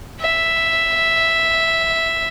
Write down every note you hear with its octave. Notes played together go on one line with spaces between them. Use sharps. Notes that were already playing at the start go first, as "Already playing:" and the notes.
E5